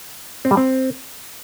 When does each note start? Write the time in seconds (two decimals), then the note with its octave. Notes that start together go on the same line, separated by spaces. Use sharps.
0.45 C4
0.51 G3
0.57 C4